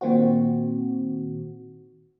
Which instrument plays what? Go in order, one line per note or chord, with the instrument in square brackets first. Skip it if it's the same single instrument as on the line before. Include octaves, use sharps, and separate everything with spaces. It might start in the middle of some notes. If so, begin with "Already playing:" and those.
[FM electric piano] A#2 D#3 C4 F#4